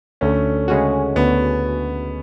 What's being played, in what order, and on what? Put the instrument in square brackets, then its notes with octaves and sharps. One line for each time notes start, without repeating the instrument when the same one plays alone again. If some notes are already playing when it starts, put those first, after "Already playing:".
[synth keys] D2 [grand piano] A3 C#4
[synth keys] C#3 G#3 C#4 F#4
[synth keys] D2 [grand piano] B3